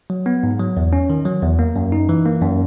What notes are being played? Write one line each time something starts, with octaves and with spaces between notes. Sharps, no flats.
F#3
B3
G#2
F#3
E2
C#4
D#3
F#3
E2
A#3
F#2
D#4
E3
A#3
F#2